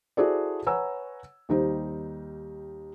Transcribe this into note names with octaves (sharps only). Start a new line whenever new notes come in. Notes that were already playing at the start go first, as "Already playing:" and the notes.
E4 F#4 G#4 A4 C5 D5
B4 C#5 F#5 G#5 A#5 E6
D#2 G3 D#4 C5